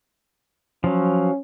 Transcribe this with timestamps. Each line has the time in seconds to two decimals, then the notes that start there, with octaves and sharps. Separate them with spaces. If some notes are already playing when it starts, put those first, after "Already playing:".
0.84 F3 F#3 C#4